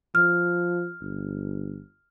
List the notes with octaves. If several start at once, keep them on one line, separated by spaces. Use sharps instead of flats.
F3 F6
G1